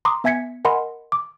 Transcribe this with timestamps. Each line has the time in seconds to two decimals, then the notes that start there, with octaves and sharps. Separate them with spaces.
0.05 A#5 C6 D6 D#6
0.24 B3 E5 G#5 G#6 B6 C#7
0.65 A#4 D#5 F#5 G#5 B5 C6
1.12 D6